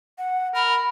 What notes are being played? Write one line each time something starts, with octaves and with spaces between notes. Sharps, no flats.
F#5
A#4 B5